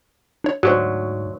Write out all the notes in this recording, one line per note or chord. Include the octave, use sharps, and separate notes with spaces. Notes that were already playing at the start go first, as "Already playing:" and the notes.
D4 C#5
D2 G#2 F#3 F#4 G4 C5